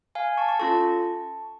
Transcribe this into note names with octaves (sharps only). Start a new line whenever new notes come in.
F5 G#5
A5 C#6
A5 C#6
C#4 F4 A4 A5 C#6